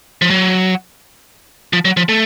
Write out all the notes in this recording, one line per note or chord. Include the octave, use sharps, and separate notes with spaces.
F3
F#3
F3
F#3
F3
A3